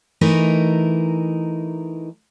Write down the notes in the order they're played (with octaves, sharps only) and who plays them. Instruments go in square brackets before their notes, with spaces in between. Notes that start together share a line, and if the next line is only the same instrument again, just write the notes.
[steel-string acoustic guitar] E3 A3 D#4 A#4